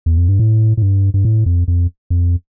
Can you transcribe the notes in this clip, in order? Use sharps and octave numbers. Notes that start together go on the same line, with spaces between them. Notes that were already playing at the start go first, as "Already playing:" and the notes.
E2
F2
G2
A2
A2
G2
G2
A2
F2
F2
F2